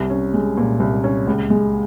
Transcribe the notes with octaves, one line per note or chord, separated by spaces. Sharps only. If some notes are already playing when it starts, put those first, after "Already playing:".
Already playing: C2
C#4
G#3
A#2
C2
C#4
C#2
G#3